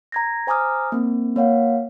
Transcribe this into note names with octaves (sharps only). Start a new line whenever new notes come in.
A#5 G#6 A#6
C5 G#5 A#5 D6 D#6 F6
A#3 C4
A#3 C#5 F5 F#5